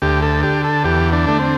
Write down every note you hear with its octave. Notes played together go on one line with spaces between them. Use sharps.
D2 G4
A4
D3 G4
A4
E2 G4
D4
D3 A3
C4